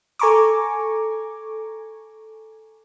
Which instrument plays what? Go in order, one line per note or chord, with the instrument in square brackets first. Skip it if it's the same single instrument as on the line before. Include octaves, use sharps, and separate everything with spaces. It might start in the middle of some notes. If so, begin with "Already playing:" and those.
[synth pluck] A4 G#5 A#5 C#6 D6